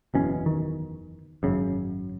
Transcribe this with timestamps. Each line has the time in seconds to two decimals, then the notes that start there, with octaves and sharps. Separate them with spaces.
0.14 F#1 E2 B2 C#4
0.46 D#3
1.43 G#1 F#2 C#3